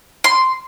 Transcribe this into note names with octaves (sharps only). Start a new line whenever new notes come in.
C6